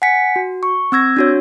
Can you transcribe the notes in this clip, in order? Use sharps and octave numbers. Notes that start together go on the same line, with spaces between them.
F#5 G#5 B6 C#7
F#4
C#6
C4 E6 G#6 A#6
D4 F#4 C#5